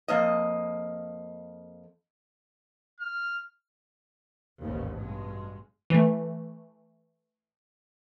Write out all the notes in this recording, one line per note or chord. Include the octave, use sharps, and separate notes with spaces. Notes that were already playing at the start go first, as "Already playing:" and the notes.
F2 A#3 D#5
F6
A1 D#2 G#2 C#3
G2 B2 G#3
E3 A3